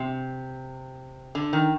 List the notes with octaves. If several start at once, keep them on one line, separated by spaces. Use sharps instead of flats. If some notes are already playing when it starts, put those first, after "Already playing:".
Already playing: C3
D3
D#3